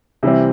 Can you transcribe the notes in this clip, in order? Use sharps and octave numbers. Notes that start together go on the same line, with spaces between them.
C3 E3 G3 C4